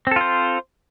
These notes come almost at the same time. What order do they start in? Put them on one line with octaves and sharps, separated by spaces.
C4 A4 F4 C5